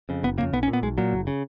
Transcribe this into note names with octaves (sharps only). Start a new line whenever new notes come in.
F2 C#3
F#1 B3
F2 C#3 A#3
B1 B3
C#4
A#2
B3
B1 G#3
A#2 F#3
F#1
C#3